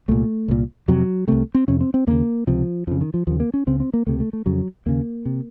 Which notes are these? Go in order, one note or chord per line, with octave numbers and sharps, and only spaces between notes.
C2 A#2 A3
C2 A#2
F2 C3 F#3
C2 C3 A3
C4
F2 C3 C#4
C4
C4
D#2 C#3 A#3
C#2 C3 F3
F2 C#3 F3
D#3
F3
D#2 C#3 F3
A#3
C#4
C#2 C#3 C4
C4
A#3
C#2 C3 A3
A3
A3
F2 C#3 F#3
D#2 C#3 A#3
C3